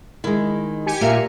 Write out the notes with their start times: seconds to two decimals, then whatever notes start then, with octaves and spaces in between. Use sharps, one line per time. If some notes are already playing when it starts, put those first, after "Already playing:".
0.24 D#3 G#3 E4
0.86 G4 G#5 C#7
1.01 A#2 A#4 E5 F5